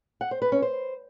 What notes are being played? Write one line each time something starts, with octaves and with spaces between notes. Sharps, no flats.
F#5
C5
B4
C#4
C5